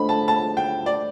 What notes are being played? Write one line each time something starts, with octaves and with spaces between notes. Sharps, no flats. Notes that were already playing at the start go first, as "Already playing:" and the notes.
Already playing: A3 D4 C5 D#5 B5
A5
A5
G5
D5